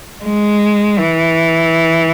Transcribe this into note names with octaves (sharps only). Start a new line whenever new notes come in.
G#3
E3